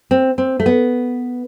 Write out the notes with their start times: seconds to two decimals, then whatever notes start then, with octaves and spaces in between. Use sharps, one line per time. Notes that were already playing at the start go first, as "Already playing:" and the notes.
0.11 C4
0.38 C4
0.60 A3
0.66 B3